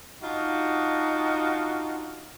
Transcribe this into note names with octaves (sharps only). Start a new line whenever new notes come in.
D4 D#4 F4 F#4